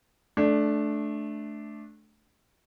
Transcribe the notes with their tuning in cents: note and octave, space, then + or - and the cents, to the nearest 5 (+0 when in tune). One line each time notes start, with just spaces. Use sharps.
A3 -15 D4 +0